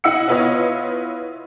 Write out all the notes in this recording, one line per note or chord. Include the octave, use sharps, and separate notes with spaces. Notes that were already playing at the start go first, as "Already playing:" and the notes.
E4 D#5 F#5 E6 C#7
B3 E4 F4 B4 C#5 D#5